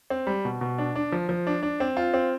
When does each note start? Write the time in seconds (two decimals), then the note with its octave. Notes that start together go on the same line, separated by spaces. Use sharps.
0.10 C4
0.27 G3
0.45 B2
0.61 B2
0.78 D4
0.95 D4
1.12 F3
1.29 F3
1.47 D4
1.63 D4
1.80 C4
1.97 F4
2.14 C4